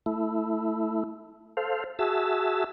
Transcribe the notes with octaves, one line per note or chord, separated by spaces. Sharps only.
A3 E4
A4 C5 F5
F#4 G#4 E5 A5 E6